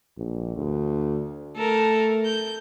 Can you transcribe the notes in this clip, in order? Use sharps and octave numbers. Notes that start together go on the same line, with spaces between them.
A#1
D2
A3 A4 A#4
G6